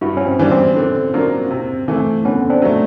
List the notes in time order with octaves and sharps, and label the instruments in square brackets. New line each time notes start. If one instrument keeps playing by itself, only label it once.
[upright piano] G2 [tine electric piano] E4 F#4
[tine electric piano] C#4
C4
[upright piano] E3 G3 B3 D4
[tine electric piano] C4
[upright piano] D3
F#3 A#3 D4 F4
C3
E3 A3 C4
[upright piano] D3 [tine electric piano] B3 C#4
[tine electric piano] C4 D4
[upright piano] F#3 A3